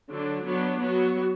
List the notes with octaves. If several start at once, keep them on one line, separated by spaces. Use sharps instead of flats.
D3 F#3 D4
F#3 B3 D4
F#3 B3 F#4